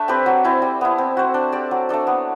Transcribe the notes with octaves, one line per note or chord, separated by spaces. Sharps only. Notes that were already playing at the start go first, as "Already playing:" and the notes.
Already playing: A3 D4 A4 D5 E5
C4 G4 B4
F#3
C4 E4
G3
B3 E4
C4
F#4 C5
D4
G4 D5
F#3
A3 D4 A4
B3